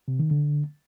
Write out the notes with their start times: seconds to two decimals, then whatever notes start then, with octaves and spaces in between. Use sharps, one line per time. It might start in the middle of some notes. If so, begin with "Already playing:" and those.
0.08 C3
0.19 D#3
0.31 D3